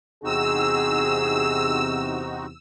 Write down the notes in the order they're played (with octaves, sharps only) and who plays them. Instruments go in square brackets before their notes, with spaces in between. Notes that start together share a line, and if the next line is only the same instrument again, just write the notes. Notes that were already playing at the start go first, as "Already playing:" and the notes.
[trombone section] E2 C3 [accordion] C4 D#4 F#4 [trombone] G#4 [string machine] E6